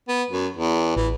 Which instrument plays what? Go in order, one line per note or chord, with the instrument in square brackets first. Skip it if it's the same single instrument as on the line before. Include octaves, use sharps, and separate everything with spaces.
[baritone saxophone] B3
F#2
E2
[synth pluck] A1 [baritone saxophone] E3